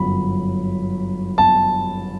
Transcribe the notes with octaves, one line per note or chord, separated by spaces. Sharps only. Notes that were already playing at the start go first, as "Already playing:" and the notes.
Already playing: G1 F#2 F#3 B5
A5